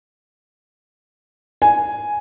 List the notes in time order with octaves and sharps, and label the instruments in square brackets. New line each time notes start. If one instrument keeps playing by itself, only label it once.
[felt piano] G#5